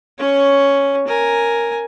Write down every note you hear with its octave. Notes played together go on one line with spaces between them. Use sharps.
C#4 C#5
A#4 G#5